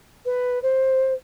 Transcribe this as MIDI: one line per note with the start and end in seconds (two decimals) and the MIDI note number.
0.25 0.61 71
0.62 1.13 72